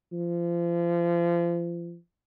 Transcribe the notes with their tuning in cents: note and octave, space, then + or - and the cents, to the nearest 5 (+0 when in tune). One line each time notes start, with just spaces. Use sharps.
F3 -30